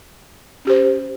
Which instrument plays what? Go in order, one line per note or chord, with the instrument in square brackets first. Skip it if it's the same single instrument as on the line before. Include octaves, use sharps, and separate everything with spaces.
[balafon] C#4 G4 C5